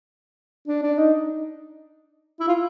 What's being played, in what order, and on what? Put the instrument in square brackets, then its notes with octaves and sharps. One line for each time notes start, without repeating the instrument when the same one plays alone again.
[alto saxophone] D4
D4
D#4
E4
F4